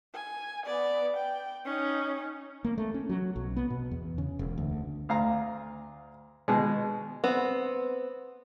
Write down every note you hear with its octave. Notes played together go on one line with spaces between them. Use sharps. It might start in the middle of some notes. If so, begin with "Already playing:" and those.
G#5
B3 D5
G5
C#4 D#4
A#3
A3
C#4
F#3
B1
B3
B2
E2
C#3
E1
D2
D2 F5 A#5
B2 G#3
B3 C4